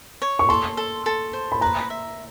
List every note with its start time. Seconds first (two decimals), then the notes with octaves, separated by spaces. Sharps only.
0.22 C#5
0.39 C#6
0.49 A4 C6
0.77 A4
1.06 A4
1.33 C5
1.52 B5
1.61 B4 A#5
1.90 E5